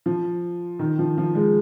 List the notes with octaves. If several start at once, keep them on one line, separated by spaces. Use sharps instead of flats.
F3
D#3
F3
F3
G#3